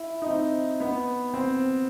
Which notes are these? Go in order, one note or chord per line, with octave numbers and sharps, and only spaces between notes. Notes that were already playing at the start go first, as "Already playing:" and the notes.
Already playing: E4
D#4
C4
B3
C4